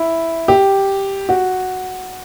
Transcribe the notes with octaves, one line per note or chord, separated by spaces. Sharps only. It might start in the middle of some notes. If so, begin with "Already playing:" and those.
Already playing: E4
G4
F#4